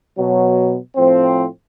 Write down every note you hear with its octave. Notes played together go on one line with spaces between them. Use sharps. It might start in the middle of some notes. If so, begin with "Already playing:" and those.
B2 F#3
A2 F3 C4